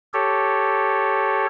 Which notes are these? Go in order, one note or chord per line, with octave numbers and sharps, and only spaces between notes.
G4 A4 C#5